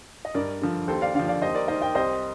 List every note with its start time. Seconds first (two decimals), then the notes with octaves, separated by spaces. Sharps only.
0.25 D#5
0.34 G2 A#4 D5
0.62 D3 F3
0.88 D#2 A4 C5
1.02 D5 F5
1.14 D3 F3 D5 F5
1.28 D5 F5
1.42 D#2 C5 D#5
1.55 A#4 D5
1.68 D#3 C5 D#5
1.82 D#5 G5
1.95 C2 C5 D#5